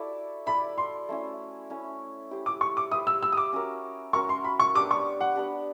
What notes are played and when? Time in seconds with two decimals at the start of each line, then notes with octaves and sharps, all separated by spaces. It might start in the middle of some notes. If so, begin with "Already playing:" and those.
Already playing: E4 F#4 A4 D5
0.46 E4 A4 D5 B5
0.78 C6
1.09 A3 C#4 E4
1.70 A3 C#4 E4
2.31 E4 G4 C5
2.46 D6
2.61 C#6
2.77 D6
2.91 E4 G4 C5 D#6
3.07 E6
3.23 E6
3.32 D#6
3.37 D6
3.52 C#4 F#4 A#4
4.13 C#4 F#4 A#4 C#6
4.29 C6
4.44 B5
4.60 C#6
4.74 B3 D4 G4 D6
4.91 C#6
5.21 F#5
5.35 B3 D4 G4